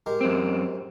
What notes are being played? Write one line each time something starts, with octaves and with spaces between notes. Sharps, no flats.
G#3 G4 A#4
F#2 C4